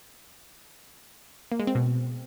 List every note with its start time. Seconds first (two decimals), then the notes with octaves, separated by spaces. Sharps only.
1.52 A#3
1.59 G#3
1.67 C4
1.75 B2